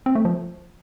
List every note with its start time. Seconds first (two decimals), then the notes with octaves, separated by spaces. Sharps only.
0.06 C4
0.15 A3
0.25 F3